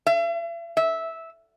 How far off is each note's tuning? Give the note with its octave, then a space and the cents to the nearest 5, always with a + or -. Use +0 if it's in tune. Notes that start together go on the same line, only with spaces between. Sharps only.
E5 +45
E5 -10